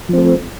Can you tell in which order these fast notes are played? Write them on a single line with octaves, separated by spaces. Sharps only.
F3 C4 A3